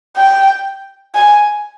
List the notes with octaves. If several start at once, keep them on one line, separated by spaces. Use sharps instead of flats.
G5
G#5